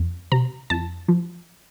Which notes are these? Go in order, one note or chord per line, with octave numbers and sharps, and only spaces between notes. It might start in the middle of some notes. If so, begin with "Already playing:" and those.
Already playing: F2
C3 A#5
F2 A5
F3